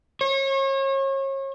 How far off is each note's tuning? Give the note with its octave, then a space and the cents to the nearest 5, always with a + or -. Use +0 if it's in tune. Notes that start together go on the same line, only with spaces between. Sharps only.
C#5 -35